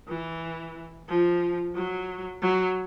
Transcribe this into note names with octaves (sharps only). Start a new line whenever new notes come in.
E3
F3
F#3
F#3